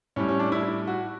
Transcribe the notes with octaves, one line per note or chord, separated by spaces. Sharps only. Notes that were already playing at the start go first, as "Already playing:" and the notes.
A2 G3 C#4
C#4
D4
E4
E4
F#4